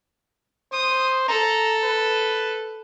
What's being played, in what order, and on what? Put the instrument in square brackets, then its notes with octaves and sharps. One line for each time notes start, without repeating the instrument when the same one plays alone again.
[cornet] C5 [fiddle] D#6
[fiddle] A4 [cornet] A#5
[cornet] B4